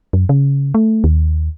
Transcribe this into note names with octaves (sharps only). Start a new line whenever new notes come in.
F#2
C#3
A3
D#2